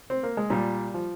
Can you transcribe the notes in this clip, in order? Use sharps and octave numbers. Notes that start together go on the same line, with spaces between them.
C4
A#3
G#3
A#2 G3
F3